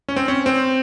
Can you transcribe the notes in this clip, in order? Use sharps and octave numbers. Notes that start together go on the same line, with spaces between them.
C#4
C4
C#4
C4